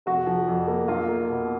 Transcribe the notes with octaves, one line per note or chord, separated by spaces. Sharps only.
F1 F#4
F3
F2
A#3
B1 F4
A#3
B2